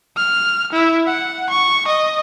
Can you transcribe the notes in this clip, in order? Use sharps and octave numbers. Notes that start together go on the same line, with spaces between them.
F6
E4
F#5
C#6
D#5